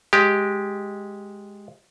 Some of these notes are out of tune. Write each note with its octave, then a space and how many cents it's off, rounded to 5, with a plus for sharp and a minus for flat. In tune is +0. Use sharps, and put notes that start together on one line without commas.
G#3 +0 G4 +0